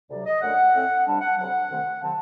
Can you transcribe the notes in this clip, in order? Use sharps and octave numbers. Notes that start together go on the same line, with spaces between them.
D2 C3 F#3 D5
D#5
F#2 D3 A3 F#5
A2 A3 C4
C3 G3 D4 A5
F#5
D2 C3 F#3 F#5
C2 C3 D#3 A3
C3 D#3 F#3 C4 A5